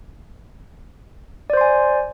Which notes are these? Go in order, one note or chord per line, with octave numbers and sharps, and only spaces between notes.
C5 D5 G#5 C6